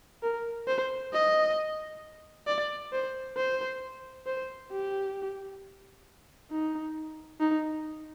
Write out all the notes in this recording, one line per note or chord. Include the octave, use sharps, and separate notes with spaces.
A#4
C5
D#5
D5
C5
C5
C5
G4
D#4
D#4